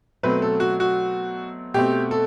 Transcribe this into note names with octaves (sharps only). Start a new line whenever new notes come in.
B2 F#3 A3 C4 B4
A4
F#4
F#4
B2 A3 C4 G4
A4